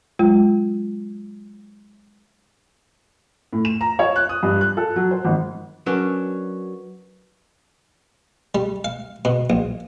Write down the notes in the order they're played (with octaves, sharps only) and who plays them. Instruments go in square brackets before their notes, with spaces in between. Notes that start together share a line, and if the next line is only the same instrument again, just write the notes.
[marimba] F#3 G#3 F4
[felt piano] A2
E7
A#5
C#5
F#6
D#6
G2
F#6
A4
F#3
C5
G#1
[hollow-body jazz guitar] F#3 C#4 D4 [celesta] A#4 B4 C#6
[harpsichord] G3
F5
B2
A#1